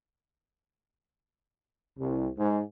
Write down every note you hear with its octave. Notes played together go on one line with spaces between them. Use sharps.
C2
G#2